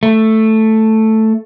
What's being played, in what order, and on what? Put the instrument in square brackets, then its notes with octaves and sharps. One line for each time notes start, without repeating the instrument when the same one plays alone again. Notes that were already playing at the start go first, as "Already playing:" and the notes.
[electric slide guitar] A3